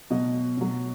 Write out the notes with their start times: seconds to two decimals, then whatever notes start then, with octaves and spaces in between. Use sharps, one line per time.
0.10 B2 F#3 D#5
0.57 B2 F#3